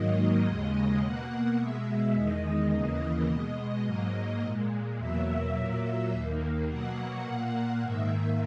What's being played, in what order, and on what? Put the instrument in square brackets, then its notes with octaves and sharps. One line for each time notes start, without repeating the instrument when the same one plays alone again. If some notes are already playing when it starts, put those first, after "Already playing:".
Already playing: [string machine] G#2 D#3 F#3 A#3 D#5
D#2 C#3 G#3
B2 A#3 F#5
B2 G#3 E5
E2 D#3 G#3 D#5
D#2 C#3 E3 A#3
B2 G#3 D#5
G#2 F#3 A#3
A#2 G#3
E2 B2 F#3 A#3 E5
A#2 F#3 A#3
D#2 D#3 A#3
B2 F#3 A#3 F#5
A#2 A#3 F#5
G#2 D#3 A#3 E5